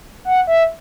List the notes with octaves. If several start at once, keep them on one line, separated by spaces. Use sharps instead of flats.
F#5
E5